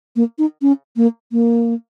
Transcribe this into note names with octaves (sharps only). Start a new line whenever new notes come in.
A#3
D#4
C#4
A#3
A#3